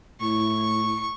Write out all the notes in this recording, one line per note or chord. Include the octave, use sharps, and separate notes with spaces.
A2 E4 C#6